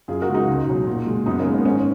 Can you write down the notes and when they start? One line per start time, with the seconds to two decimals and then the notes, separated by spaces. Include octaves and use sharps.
0.08 F#2 F4 G#4
0.21 F#4 A#4
0.28 C#3 G#3
0.34 D#4 F#4
0.47 C#2
0.67 B2 F#3
0.87 A#2
1.06 G#3
1.26 F#2 B3 D#4
1.39 A#3 C#4
1.46 D#3 G#3
1.52 B3
1.65 G#2 A#3 C#4